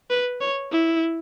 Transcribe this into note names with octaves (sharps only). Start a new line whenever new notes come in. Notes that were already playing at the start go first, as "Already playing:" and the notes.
B4
C#5
E4